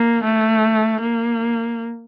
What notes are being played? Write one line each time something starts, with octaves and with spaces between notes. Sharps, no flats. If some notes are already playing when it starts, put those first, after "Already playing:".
Already playing: A#3
A3
A#3